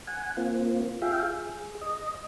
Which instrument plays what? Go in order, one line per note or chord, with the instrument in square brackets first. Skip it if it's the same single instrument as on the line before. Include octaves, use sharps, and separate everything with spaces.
[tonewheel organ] F#5 G#5
A#3 C4 F4
F4 G#4 E5 F5 G5
G#4
D#5